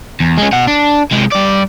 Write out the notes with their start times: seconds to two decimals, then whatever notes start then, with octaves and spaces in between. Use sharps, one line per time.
0.20 E2
0.38 G#3 C#4
0.52 B2 F#5
0.67 D4
1.11 C3 G#3
1.32 G2 D5